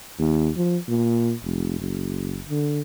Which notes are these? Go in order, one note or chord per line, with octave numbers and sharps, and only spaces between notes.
D#2
F3
A#2
F1
F#1
D3